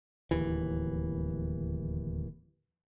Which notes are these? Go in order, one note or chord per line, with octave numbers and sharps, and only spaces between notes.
D1 D#2 E3